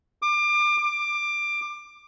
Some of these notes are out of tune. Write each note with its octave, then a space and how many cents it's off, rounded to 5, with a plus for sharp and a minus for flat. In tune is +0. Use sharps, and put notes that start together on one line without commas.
D6 +30
D6 +20